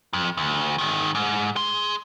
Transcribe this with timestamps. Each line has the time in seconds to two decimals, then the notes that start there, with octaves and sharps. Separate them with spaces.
0.13 F2
0.37 D2
0.78 G#2 D#3
1.15 G#2
1.56 G#4 C6